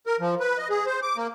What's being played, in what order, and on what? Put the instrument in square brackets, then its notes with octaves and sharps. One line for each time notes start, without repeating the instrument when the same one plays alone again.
[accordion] A#4
F3
B4
D#5
G#4
C5
D6
A#3